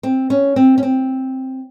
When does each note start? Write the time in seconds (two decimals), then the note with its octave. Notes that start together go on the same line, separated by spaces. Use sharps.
0.03 C4
0.30 C#4
0.56 C4
0.78 C#4
0.83 C4